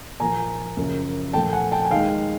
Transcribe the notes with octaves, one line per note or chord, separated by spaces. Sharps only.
A#2 F3 A#3 G#5 A#5
F#2 C#3 F3 A#3
A#2 F3 A3 G5 A5
F#5 G#5
G5 A5
G#5
D#2 D#3 G#3 F5 G5